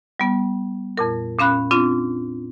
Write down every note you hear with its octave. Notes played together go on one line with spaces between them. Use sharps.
G3 B3
F2 A#2 A#4
A#2 C#4 F5 B5 F#6
C4 D4 F4